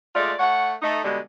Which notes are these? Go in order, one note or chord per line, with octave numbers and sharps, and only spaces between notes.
G#3 A3 F4 D5
A3 C#5 F#5
A3 D#4
B2 D3 G3 G#3